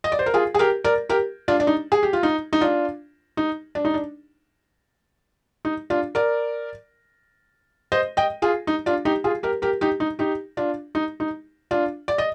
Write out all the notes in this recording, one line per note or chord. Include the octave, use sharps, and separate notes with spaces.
D#5
D5
C5
A#4
F4 G#4
G#4
G4 A#4
A#4 D5
G4 A#4
D4 F4
D4
D#4
G#4
G4
F4
D#4
D#4
D4 F4
D#4
D4
D#4
D4
D#4
D4 F4
A#4 D5
C5 D#5
D#5 G5
F4 G#4
D#4
D4 F4
D#4 G4
F4 G#4
G4 A#4
G4 A#4
D#4 G4
D#4
D#4 G4
D4 F4
D#4
D#4
D4 F4
D5
D#5